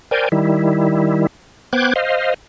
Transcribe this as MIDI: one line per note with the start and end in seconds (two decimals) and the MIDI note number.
0.11 0.29 70
0.11 0.29 72
0.11 0.29 74
0.11 0.29 79
0.11 0.29 80
0.32 1.27 51
0.32 1.27 55
0.32 1.27 64
1.73 1.93 59
1.73 1.93 72
1.73 1.93 79
1.73 1.93 86
1.73 1.93 90
1.73 1.93 92
1.96 2.34 72
1.96 2.34 75
1.96 2.34 77